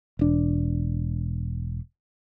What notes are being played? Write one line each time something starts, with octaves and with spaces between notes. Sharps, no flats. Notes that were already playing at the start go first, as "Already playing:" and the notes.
E1 D4